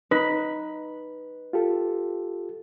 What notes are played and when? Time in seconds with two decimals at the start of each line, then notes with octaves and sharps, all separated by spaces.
0.11 D#4 B4
1.53 F4 G4 A4